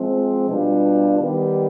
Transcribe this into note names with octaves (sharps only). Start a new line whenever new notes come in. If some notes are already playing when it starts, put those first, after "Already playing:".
Already playing: F3 G#3 C4
B2 G3 D4 F4 B4
D#3 G3 B3 D#4 G4